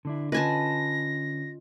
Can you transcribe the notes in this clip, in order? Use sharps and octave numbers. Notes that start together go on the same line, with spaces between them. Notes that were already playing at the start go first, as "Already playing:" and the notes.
D3 D4 E4
D3 C#4 F4 B4 D#5 G#5 A5 A#6